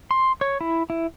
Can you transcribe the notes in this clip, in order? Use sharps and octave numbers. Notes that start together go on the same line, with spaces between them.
C6
C#5
E4
E4